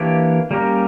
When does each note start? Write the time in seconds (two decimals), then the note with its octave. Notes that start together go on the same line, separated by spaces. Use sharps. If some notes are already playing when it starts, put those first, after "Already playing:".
Already playing: E3 A#3 D4 G4 C#5
0.51 G3 A#3 C#4 G4 A#4